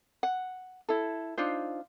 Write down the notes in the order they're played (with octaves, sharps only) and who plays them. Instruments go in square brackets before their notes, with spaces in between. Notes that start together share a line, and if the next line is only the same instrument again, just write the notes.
[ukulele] F#5
E4 A4
D4 D#4 F4 C5